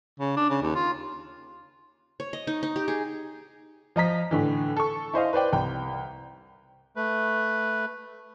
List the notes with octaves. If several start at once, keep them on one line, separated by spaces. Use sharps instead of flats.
C#3
D4
C#3
D#2
F4
C#5
D#5
D#4
D#4
G4
G#4
F3 D#5 A#5 B6
A2 D3 E3
A4 C#6
E4 C5 D#5 F5
B4 C5 D5 G5
C2 G5
A3 B4